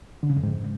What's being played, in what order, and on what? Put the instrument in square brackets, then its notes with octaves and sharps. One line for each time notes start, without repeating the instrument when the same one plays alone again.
[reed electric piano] D3
C#3
F2
G#2